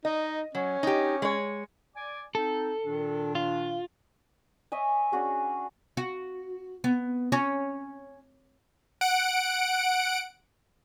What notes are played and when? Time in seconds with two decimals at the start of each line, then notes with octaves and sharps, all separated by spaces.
0.05 D#4 D#5
0.55 F#3 C#4
0.83 D#4 G4
1.22 G#3 C#5
1.96 D5 G#5 D6
2.35 C4 D#4 A4
2.84 A#2 D#3 D4
3.35 F4
4.72 C#5 D#5 E5 G#5
5.12 C#4 D4 F#4 G#4
5.97 F#4
6.84 B3
7.32 C#4
9.01 F#5 D7